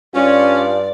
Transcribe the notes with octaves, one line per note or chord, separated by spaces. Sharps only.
G2 C#4 F4 D5